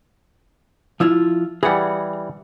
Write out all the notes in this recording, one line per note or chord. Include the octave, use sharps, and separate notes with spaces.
F3 E4 F4
E3 G3 G#4 F#5